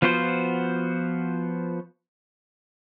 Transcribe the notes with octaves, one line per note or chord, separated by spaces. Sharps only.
F3 B3 F4 F#4 C5